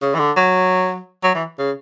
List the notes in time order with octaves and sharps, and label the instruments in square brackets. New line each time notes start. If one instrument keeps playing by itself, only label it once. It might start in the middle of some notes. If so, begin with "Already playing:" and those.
[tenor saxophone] C#3
E3
D3
F#3
F#3
E3
C#3